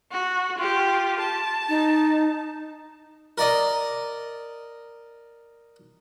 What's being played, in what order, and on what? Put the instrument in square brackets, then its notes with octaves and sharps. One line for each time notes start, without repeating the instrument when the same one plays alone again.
[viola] F#4
F4 G4
A5
[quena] D#4
[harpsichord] A#4 D5 D#5